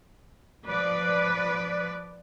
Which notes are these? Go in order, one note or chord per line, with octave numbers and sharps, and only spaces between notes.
F3 B4 D5